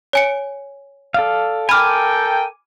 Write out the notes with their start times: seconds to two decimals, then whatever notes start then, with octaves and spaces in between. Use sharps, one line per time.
0.13 C#5 G#5 C#7
1.14 A4 D5 F5
1.69 A4 A#4 G5 G#5 B5 D6 F6